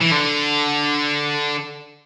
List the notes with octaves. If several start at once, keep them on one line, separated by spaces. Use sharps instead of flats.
E3
D3